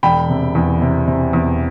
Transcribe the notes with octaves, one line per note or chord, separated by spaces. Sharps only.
E1 G5 B5
C3
E2
C3
C3
E2